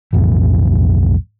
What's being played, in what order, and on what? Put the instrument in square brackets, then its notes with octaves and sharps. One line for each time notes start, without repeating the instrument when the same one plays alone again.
[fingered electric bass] B1 F2 A2 E3